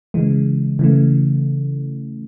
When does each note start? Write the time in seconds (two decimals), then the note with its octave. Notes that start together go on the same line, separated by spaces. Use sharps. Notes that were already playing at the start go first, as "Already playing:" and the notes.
0.14 C#3 E3 G#3
0.79 C#3 E3 A3